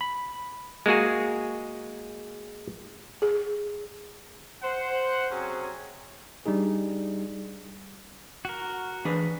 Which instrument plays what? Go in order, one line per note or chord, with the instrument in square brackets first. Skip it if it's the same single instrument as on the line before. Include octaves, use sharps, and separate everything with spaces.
[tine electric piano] B5
[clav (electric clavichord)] G#3 A#3 F#4 G#4
[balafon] G#4
[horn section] C5 F#5
C3 F#3 C#4 G#4
[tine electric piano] G3 D4 D#4 G#4
[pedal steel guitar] F#4 A#4
[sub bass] E3 [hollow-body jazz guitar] D4 G#4 B4